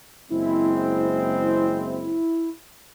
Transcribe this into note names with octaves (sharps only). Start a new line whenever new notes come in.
F#1 G#3 C4 E4